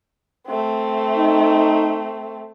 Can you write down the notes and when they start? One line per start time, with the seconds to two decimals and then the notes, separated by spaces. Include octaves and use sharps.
0.47 A3 C4
1.17 D#4